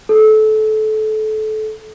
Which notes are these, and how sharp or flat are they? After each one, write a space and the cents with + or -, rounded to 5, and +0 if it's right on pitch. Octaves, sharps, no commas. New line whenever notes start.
A4 -25